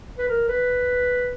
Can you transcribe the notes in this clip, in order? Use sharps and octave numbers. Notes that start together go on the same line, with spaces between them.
B4
A#4
B4